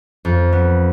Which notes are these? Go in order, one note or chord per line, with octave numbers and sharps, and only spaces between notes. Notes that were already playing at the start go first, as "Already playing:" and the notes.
F2
B3